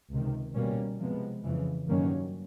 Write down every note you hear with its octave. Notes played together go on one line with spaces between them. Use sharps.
C#2 C3 D#3
B2 G3 A#3 C#4
C3 F3 G#3 B3
F2 C#3 E3
G2 D#3 F#3 A#3 C#4